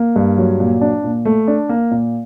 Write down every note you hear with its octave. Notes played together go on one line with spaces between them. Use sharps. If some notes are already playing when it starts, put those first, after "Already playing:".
Already playing: A#3
G2
F#3
A#2
D4
A#2
A3
D4
A#3
A#2